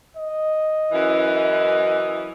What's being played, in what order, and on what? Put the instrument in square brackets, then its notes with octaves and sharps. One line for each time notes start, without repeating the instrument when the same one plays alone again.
[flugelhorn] D#5
[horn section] F#2 E3